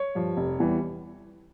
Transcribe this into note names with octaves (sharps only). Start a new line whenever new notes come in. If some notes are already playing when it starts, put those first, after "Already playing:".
Already playing: C#5
G2 F3
F1
E2 E3 G3